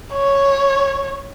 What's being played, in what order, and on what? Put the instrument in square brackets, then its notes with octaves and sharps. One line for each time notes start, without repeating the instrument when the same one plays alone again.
[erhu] C#5